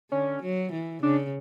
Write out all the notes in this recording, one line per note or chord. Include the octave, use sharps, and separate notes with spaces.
D3 C#4
F#3
E3
C#3 D4